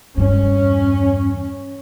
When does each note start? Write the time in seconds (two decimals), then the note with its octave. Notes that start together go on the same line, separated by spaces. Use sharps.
0.17 E2 G2 C#4